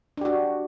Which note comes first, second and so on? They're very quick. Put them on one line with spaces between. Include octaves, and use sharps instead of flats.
D4 G4 F#4